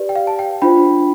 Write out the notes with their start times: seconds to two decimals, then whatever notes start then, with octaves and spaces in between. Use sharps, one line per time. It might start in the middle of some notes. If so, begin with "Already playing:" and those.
Already playing: G4 B4 D5
0.09 G5
0.15 F5
0.27 A5
0.39 G5
0.62 D4 F4 C5 G5 B5